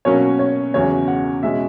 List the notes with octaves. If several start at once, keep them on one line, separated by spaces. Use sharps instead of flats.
B2 F#3 A#3 C#4 C#5
C#5
E2 C#3 F#3 C#4 C#5
F#5
B2 G#3 C#4 E5